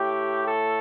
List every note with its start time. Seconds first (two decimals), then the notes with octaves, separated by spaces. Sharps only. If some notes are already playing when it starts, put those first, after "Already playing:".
Already playing: A2 A3 G4
0.46 A4